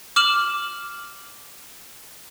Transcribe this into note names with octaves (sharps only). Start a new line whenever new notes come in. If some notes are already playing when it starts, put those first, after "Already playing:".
D6 F6 E7 F#7